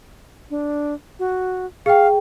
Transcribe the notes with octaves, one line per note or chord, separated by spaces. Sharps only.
D4
F#4
G#4 F5 G5